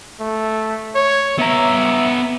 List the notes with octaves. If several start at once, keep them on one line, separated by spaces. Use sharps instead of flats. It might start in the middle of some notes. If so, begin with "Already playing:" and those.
A3
C#5
B3 E5 A#5